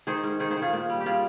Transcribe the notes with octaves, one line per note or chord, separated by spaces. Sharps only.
D#3 G#4 C5
G#2
D#3 G#4 C5
G#4 C5
D#3
F4 G#4
A#2
G3
G4
G3 F4 G#4